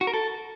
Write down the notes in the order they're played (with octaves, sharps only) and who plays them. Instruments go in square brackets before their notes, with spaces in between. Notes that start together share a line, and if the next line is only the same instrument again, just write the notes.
[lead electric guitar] F#4
A#4
A4